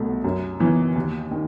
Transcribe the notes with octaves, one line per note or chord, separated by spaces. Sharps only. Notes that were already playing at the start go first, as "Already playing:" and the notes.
Already playing: C2 B2 A3
F#2
E3 B3
D#2
D#3